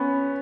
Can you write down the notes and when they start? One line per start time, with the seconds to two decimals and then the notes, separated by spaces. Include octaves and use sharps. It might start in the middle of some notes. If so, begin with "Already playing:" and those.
Already playing: B3 C#4